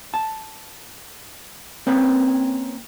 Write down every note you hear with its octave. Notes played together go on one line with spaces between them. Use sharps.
A5
A#3 C4 C#4 B4